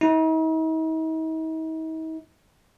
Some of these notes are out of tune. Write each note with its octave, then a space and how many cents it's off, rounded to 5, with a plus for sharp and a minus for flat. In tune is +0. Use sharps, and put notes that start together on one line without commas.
D#4 +45